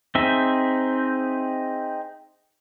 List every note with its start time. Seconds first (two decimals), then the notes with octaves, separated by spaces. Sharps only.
0.15 C4 D#4 G#4 E5